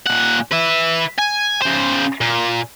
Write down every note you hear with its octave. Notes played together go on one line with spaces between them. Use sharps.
A#2 F#5
B4 E5
G#5
C#3 C5
A#2